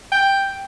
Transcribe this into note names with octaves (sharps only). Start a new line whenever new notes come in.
G5